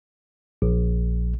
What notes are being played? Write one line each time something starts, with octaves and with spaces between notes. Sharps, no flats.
A#1